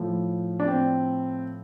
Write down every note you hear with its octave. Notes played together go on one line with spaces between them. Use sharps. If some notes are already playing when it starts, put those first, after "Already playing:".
Already playing: A2 F3
D4
C4